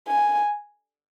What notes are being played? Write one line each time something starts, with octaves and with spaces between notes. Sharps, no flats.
G#5